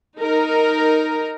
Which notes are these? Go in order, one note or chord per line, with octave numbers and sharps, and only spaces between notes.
D#4 A#4